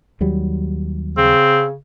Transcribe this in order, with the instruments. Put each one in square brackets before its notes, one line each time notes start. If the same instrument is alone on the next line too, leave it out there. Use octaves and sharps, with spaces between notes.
[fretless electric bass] D#2 F#3 G3
[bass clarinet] C#3 [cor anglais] C4